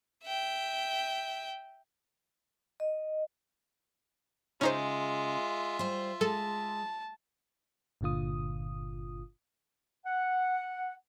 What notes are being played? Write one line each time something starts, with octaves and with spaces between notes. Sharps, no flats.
E5 G5
D#5
C#3 G#3 C#4 D#4 F4 C5 E5
G3 C5
G#3 A4 A5
G1 A#2 D3 F4 D#6
F#5